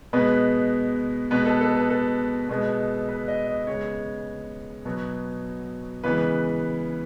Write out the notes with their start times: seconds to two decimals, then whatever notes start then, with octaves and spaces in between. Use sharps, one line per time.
0.13 B2 G#3 B3 B4
1.31 B2 G#3 B3 B4
1.46 A4
1.61 A4
1.75 B4
1.90 A4
2.49 B2 G#3 B3
3.09 B4
3.28 D#5
3.47 D#5
3.67 C#3 G#3 B3 C#5
4.85 B2 F#3 B3
6.04 C#3 E3 G#3 B3 B4